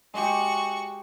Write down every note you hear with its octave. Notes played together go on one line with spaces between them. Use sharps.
G#3 F#4 G4 C#6